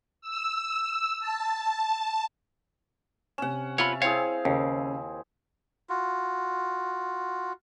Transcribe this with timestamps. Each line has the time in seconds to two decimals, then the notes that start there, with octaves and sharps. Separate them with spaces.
0.21 E6
1.20 A5
3.38 C3 C#4 F#5 E7
3.78 B3 F4 C#5 E5 F5 A5 B5
4.02 C4 E4 G#4 C#5 F5
4.45 D#2 C#3
5.89 F4 F#4